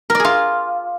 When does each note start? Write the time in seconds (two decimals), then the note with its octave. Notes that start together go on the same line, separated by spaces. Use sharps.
0.10 A#4
0.15 D5
0.20 G#4
0.25 F4